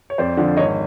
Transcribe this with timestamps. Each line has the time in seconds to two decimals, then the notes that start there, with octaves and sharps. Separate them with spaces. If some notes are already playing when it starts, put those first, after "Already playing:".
0.10 C#5
0.18 F2 C5 D5
0.37 D3 F3
0.57 G#1 C#5 D#5